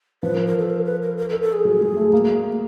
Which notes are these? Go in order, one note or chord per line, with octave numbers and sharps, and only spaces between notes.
F3 B4
A#4
A#4
A4
A#4
B4
A#4
A#4
A4
A4
G#4
F#3
G#3
A3
A#3